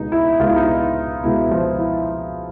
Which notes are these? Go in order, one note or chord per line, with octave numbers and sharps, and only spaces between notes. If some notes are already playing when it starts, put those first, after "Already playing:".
Already playing: C#2 B2 G#3 B3 D#4
E4
C#2 B2 G#3 B3 F4
E4
D#4
E4
C#2 B2 G#3 B3 E4
F3 F4
E4